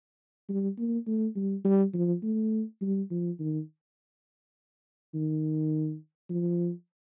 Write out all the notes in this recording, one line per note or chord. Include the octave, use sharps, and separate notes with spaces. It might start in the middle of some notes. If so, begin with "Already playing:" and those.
G3
A#3
A3
G3
G3
F3
A3
G3
F3
D#3
D#3
F3